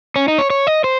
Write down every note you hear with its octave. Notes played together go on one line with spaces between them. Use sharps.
C#4
D#4
C#5
C#5
D#5
C5